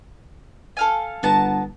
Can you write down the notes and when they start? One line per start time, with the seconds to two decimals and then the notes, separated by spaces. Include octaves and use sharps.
0.77 A4 F5 G#5
1.23 G1 B3 A5 A#5